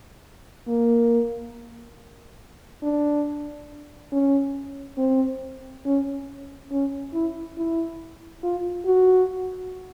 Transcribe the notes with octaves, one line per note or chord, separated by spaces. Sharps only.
A#3
D4
C#4
C4
C#4
C#4
E4
E4
F4
F#4